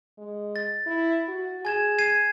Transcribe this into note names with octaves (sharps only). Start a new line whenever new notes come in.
G#3
A6
E4
F#4
G#4 G#5 G#6 E7
G#6 C7 D#7